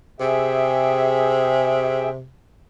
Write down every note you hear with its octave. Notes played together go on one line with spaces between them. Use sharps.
C3 G#4 E5 G5